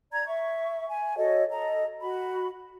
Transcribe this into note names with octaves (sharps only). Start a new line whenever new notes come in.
D5 A#5 G#6
E5 C#6
G#5
F#4 A4 C#5 D#5
A4 D#5 A#5
F#4 B5